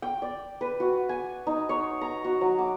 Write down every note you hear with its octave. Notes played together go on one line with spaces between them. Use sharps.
G5
D5
B4
F#4
G#5
D#4
C#5
A#5
F#4
F#3
D6